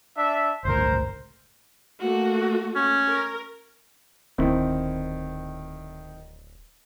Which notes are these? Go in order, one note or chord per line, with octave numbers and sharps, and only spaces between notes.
D4 E5
G1 C#2 A2 A#4 C5
A3 A#3 F#4
C#4
A#4
D1 D#3 C4 E4